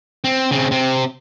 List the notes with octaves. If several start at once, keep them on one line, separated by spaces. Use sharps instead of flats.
C4
C#3 C4
C3 C4